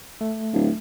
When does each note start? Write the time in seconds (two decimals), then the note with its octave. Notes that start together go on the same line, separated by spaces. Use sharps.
0.21 A3
0.53 D1